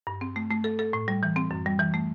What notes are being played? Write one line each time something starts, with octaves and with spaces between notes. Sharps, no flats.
G2
C4
A3
A3
A4
A4
A2
G3
E3
C4
F#2
G3
E3
A3